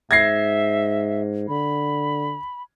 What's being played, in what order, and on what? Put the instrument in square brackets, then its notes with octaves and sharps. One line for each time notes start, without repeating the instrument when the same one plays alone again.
[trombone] G#2 [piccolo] E5 [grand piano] G#6 A#6 C7
[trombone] D3 [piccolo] B5